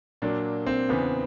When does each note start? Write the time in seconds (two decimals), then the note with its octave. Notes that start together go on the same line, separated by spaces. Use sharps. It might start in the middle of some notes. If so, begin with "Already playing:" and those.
0.22 A#2 F#3 A#3 D4
0.67 C4
0.89 E2 C#3 E3 B3